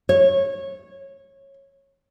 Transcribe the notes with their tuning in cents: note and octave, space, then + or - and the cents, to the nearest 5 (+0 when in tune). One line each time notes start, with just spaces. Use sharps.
C#5 -15